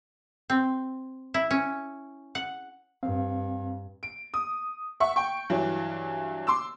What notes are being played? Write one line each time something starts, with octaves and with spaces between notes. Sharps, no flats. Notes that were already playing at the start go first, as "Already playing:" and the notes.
C4
E4
C#4
F#5
G2 C4 F5
D7
D#6
E5 F#5 C#6
G5 C#6
G2 E3 F#3
C6 D6 E6